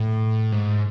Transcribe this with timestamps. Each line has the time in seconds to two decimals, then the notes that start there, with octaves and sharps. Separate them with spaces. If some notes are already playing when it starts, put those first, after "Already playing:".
Already playing: A2
0.52 G#2